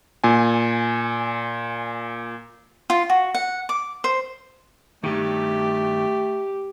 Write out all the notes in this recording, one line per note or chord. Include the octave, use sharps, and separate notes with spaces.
A#2 G#5
F4
F#4
F#5
D6
C5
G2 D#3 A3 G4